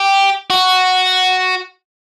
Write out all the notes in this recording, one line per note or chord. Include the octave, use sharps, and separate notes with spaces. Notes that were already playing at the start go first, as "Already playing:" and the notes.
Already playing: G4
F#4